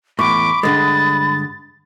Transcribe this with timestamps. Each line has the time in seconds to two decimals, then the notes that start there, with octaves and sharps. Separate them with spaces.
0.19 E2 A2 B5 C#6 D6 B6 D7
0.63 G2 D3 G#3 D#6 A6